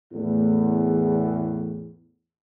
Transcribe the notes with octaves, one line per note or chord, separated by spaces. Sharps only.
E2 A2